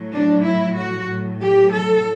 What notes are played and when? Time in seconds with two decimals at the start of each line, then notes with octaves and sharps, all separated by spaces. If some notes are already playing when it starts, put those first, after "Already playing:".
Already playing: A2 F#3
0.12 D4
0.44 E4
0.77 F#4
1.08 A2 F#3
1.41 G4
1.73 A4